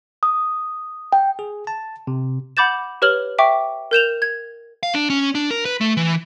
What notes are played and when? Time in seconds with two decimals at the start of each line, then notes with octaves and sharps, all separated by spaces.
0.23 D#6
1.13 G5
1.39 G#4
1.67 A5
2.07 C3
2.57 F#5 B5 D6 G6 A6 E7
3.02 G4 B4 C#5 F6 F#7 G7
3.39 E5 G5 C#6 D6
3.91 A#4 G6 E7 F7
4.22 G#6
4.83 F5
4.95 D4
5.10 C#4
5.35 D4
5.51 A#4
5.65 B4
5.81 A3
5.97 E3